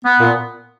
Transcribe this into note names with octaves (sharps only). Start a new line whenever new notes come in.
B3
A#2